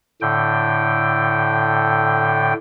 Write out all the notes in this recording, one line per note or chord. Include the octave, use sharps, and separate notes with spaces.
A2 D3 G5